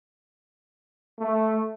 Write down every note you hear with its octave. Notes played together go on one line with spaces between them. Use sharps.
A3